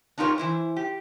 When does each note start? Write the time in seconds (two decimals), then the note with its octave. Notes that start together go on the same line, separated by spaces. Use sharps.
0.18 D4 D#4 F4 G4 A#4 C#5
0.38 E3 E4 C5
0.77 G4